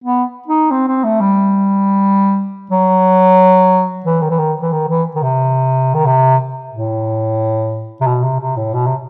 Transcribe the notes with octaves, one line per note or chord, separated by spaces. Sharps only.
B3
D#4
C4
C4
A3
G3
F#3
E3
D#3
E3
D#3
E3
D#3
E3
D#3
C3
D#3
C3
A2
C3
B2
C3
C3
A2
B2
C3